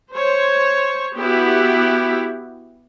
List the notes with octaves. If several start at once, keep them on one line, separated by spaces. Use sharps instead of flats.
C5 C#5
B3 E4 F#4 G4